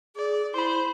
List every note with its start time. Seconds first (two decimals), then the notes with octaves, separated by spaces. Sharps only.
0.16 G#4 D5
0.54 E4 C5 B5 C6